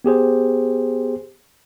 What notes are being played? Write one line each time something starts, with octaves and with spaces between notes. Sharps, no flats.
B3 G4 G#4 C5